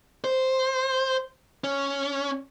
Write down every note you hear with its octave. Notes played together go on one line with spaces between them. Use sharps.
C5
C#4